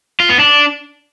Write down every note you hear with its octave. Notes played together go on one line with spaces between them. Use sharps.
F4
B3
D4